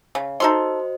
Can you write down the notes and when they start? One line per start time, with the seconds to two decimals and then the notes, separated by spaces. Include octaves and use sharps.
0.15 C#3
0.40 D#4 F#4 A4 C5 D#5 C6